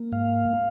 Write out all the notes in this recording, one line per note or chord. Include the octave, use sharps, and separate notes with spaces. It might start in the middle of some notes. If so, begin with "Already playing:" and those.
Already playing: A#3
G#2 F5